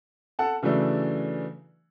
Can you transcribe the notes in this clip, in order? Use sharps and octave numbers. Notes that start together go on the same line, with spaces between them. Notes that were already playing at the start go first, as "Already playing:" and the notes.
A4 F#5 A5
C#3 E3 F#3 A3 D4